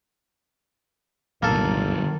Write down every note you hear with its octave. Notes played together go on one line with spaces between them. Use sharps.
G1 C2 F#2 A#2 D#3 A#3 A4